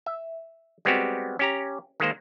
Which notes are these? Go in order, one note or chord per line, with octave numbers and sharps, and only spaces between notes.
E5
G3 G#3 B3 C4 F#4 G4
C#4 G4 A#5
D#3 G#3 A#3 C5